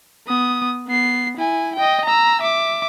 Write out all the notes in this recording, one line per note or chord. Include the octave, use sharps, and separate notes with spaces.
B3 D#6
B3 C7
E4 G#5
D#5 G5
A#5 E6
E5 D6